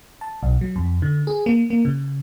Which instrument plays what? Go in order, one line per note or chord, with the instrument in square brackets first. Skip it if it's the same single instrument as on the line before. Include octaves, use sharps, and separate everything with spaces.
[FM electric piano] A5
B1
F#3
F2
D3
G#4
A#3
A#3
C#3